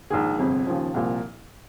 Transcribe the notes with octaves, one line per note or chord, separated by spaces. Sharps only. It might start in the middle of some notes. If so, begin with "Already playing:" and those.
A#1 G#2 D#3 G#4
G1 F2 C3
D#2 C#3 F3
C2 A#2 F3